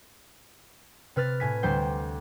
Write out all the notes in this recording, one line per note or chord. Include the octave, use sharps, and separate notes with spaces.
C3 B4 F6 A6
A2 G#5 B6
D2 G3 C5 G5